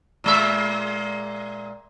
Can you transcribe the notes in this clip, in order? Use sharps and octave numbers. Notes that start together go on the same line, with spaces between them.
A#2 G#3 E5